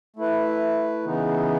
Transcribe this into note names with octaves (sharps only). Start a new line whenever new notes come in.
A3 E4 B4
C#3 E3 B3 D#4